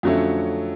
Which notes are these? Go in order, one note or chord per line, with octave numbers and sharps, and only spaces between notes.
F2 D3 F#3 A3 C#4